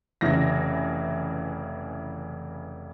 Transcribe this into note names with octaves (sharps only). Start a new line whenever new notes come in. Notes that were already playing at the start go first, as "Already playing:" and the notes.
F1 C#3 E3 A#6